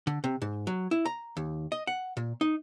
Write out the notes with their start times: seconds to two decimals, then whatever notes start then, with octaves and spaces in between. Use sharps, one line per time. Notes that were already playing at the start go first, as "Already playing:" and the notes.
0.07 D3
0.24 C3
0.42 G#2
0.67 F#3
0.91 E4
1.06 A#5
1.37 D#2
1.72 D#5
1.87 F#5
2.17 A#2
2.41 D#4